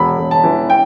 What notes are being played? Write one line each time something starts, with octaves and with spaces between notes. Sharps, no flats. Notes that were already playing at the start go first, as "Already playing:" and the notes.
Already playing: E1 B5
E1
A5
E3
G5